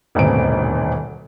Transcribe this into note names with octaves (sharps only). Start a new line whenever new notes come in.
D#1 G#1 D2 B2 C4 D7